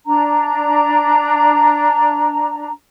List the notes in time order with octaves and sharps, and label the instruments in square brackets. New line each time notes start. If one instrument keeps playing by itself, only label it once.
[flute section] D4 A#5